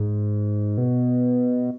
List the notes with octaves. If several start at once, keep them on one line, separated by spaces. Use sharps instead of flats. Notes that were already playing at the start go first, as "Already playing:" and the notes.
Already playing: G#2
B2